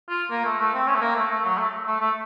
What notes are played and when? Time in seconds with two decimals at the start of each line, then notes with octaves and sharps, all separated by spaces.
0.09 F4
0.30 A#3
0.45 A3
0.59 A3
0.74 C4
0.87 C#4
0.95 A3
1.01 A#3
1.16 A3
1.30 A3
1.45 F#3
1.58 A3
1.86 A3
2.01 A3